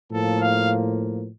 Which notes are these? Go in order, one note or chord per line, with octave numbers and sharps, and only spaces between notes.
A2 F3 A#3 A4
F5